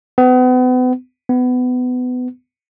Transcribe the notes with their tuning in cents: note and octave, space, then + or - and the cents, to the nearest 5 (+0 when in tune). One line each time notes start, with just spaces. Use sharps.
B3 +35
B3 +20